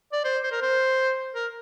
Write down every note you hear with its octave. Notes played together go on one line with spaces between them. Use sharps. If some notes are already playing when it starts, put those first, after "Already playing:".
D5
C5
C5
A#4
C5
A#4